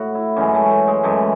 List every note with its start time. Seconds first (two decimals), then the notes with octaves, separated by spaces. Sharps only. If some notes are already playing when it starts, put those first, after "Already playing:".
Already playing: A2 F#4
0.15 E4
0.36 F#2 E3 G#3 C#4
0.54 A3
0.71 A3
0.88 G#3
1.03 F#2 E3 G#3 A3